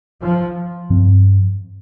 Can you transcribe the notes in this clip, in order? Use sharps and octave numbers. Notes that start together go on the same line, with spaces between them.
F3
G2 F3 C4